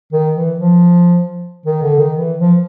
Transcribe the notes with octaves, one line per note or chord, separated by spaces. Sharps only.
D#3
E3
F3
D#3
D3
D#3
E3
F3